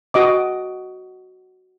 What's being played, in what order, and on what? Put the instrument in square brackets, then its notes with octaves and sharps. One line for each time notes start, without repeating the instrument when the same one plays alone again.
[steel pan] F#4 D#5 D6